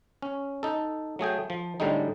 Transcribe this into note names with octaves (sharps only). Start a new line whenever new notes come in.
C#4
D#4 A4
F#3 A3 G#4 G5
F3
A2 D3 G3 G#3 D#4